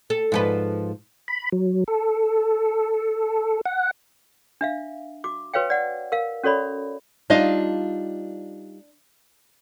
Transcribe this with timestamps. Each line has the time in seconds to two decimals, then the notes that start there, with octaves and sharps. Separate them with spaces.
0.10 A4
0.32 G#2 F3 B4
1.28 B5
1.52 F#3
1.88 A4
3.65 F#5
4.61 D4 E5 F5
5.24 F#4 D6
5.54 F#4 B4 C#5 F5 G5
5.70 D5 F#5
6.12 A#4 F5
6.44 C#4 F#4 A4 C#5 D5 B5
7.30 G3 D4 D#4 F4 D#5 F5